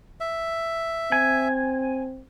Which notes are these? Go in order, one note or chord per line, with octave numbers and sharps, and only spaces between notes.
E5
C4 G#5